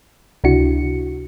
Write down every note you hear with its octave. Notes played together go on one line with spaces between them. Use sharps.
C#2 C3 D4 E4 F#4 C#7